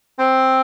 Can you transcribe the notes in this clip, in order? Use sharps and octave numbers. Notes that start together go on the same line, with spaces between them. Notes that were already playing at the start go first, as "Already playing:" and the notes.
C4